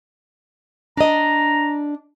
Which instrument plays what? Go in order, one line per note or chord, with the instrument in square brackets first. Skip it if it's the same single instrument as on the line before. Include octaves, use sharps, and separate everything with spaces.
[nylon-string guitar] D4 D#5 [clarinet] A#5